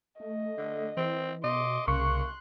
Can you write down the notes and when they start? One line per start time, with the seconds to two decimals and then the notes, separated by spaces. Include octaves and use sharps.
0.20 A3 D#5
0.58 D3
0.97 E3 C4
1.44 B2 D#5 C6 D6
1.88 C2 C#3 A#3 C6 C#6 F#6